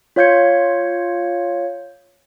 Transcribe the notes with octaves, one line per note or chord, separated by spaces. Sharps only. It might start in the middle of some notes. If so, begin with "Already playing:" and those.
F4 C#5 F5 G6 G#6 C#7